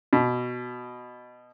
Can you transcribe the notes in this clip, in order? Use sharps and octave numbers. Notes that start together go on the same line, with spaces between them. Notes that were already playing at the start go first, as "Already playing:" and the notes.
B2